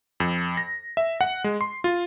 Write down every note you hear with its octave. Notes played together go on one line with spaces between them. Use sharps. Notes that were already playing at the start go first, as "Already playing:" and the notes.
F2
A#6
E5
F#5
G#3
C6
F4